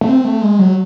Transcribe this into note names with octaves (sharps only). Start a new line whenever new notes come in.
A3
C4
A3
G#3
F#3